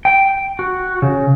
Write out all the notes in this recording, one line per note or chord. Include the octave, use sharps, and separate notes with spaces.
G5
F#4
C#3